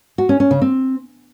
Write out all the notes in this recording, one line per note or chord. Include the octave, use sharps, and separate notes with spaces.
F#4
C#4
C#4
C#3
C4